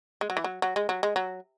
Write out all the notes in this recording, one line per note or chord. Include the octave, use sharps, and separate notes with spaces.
G#3
F#3
E3
F#3
F#3
G#3
F#3
G#3
F#3